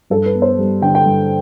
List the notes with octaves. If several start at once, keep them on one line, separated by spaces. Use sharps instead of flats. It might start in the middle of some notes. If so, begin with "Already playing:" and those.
G2 A4
B4
B3
C5
G3
D3 G5
G5
G2